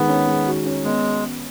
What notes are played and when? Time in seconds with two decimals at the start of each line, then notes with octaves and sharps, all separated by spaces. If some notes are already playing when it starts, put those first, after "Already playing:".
Already playing: D#3 G#3 B3
0.08 C#4
0.27 G#3
0.47 F#4
0.66 C#4
0.84 G#3 B3